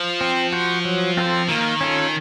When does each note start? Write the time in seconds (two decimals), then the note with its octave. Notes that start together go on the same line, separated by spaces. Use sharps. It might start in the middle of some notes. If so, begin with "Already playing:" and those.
Already playing: F3
0.21 C4
0.52 F#4 C5
0.85 F#3
1.17 C4 F4 A4 C5
1.48 D#3 A#3
1.81 C#4 F4 A4